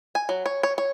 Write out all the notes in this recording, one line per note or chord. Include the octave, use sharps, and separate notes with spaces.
G#5
F#3
C#5
C#5
C#5